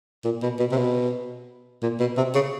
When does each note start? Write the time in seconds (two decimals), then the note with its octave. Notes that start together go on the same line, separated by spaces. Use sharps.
0.25 A#2
0.43 B2
0.59 B2
0.72 C3
0.78 B2
1.82 A#2
2.00 B2
2.17 C3
2.35 C#3